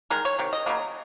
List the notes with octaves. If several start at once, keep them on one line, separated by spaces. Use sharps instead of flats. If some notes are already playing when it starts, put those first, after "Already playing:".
D#3 G#3 A#4
C#5
C3 D#3
D#5
C#3 F#3 A#3